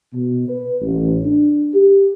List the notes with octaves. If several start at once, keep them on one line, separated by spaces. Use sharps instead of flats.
B2
B4
A1
D4
G4